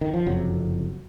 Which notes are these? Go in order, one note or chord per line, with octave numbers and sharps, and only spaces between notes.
D#3
F3
F#1 F2 C3 F#3